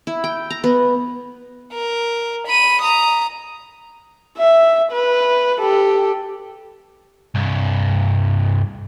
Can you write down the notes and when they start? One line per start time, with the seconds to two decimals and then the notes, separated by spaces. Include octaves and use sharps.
0.07 E4
0.24 G5
0.50 A#5
0.64 B3
1.74 A#4
2.47 B5 D#7
2.82 A#5 D#6
4.38 E5
4.92 B4
5.60 G4 A4
7.35 C2 G2